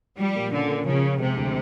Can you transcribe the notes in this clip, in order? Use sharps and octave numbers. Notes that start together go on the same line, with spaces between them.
F3 G3
A#2
D3 C#4
A#3
C#3 F3
F3
C3 G#3
D2